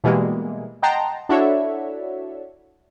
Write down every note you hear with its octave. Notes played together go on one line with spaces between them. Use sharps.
B2 E3 G3 G#3 A#3
D#5 F#5 G5 A5 A#5 C6
D4 E4 F#4 A4 C#5 E5